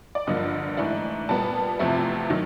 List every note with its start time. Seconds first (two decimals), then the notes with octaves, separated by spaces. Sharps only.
0.15 D5
0.27 G2 D3 F3 A#3 D#5
0.77 G#2 E3 A3 D4
1.29 A#2 G3 B3 A5
1.79 E2 C3 F3 A3
2.30 D#3 F#3